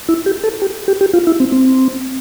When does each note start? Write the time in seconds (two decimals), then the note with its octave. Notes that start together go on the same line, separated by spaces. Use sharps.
0.09 E4
0.26 G4
0.43 A4
0.62 G4
0.88 G4
1.01 G4
1.14 F4
1.27 E4
1.40 C4
1.52 C4